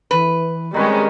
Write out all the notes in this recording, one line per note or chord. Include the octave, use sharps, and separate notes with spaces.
E3 B4
D#3 G3 G#3 C4 C#4 B4